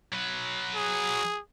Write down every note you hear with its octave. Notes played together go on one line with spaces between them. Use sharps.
F#3 B4
G#4